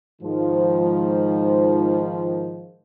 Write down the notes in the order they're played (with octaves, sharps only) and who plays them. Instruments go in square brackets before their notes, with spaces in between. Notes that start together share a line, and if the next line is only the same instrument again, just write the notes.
[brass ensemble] G#2 D#3 F3